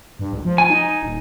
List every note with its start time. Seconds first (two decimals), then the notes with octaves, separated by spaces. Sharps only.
0.19 G2
0.33 C#2
0.45 F3
0.58 G#5
0.70 D#4
1.03 D#1